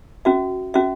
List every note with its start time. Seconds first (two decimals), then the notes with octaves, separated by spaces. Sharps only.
0.25 C#4 F#4 E5
0.74 C#4 F#4 E5